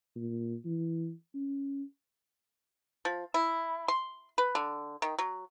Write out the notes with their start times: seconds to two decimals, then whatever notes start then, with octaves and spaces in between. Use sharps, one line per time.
0.16 A#2
0.65 E3
1.35 C#4
3.05 F3
3.34 E4
3.88 C6
4.38 B4
4.55 D3
5.02 D#3
5.18 F#3